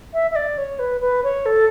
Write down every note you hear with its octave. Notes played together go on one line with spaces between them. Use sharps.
E5
E5
D5
C#5
B4
B4
C#5
A4